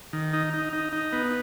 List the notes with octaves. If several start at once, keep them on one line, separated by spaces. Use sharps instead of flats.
D#3
D#4
D#4
D#4
D#4
B3